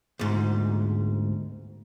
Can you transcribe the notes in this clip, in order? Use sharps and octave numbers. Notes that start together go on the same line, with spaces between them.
D2 G#2